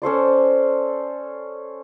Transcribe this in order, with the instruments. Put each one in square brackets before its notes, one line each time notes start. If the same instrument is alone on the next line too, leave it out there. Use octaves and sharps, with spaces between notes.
[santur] C#4 A4 C5 D5